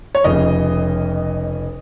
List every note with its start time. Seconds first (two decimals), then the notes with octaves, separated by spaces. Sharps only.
0.15 C#5
0.24 F1 F2 C#3 D#5